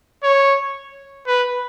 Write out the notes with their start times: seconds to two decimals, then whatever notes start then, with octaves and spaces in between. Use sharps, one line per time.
0.23 C#5
1.27 B4